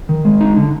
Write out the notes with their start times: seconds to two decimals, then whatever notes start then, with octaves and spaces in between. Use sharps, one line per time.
0.09 D#3
0.25 G#3
0.41 D#4
0.57 D3